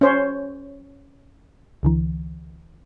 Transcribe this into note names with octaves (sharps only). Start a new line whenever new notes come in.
C#4 C5 C#5
C#2 D3 E3